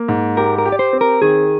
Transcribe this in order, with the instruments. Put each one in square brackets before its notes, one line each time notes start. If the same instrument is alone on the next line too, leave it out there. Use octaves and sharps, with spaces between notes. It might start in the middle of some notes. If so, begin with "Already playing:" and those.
Already playing: [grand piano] A#3
G#2
[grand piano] G4 [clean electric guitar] A#4
[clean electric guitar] A#4
[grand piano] G4
[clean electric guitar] D5
C5
[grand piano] C4
[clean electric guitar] A#4
[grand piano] D#3 [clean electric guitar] G#4